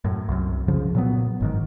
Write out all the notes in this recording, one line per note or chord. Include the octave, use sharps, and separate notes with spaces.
F#2 A2
C2 F#2
C#3 F3
A#2 F#3 B3
G1 G#2 D#3